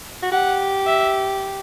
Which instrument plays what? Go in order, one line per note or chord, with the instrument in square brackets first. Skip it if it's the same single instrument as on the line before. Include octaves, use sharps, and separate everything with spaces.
[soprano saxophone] F#4
[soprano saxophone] G4 [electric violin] F#5
[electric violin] E5